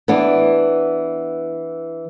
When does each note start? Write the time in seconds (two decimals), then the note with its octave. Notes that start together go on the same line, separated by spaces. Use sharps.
0.08 E3 B3 D4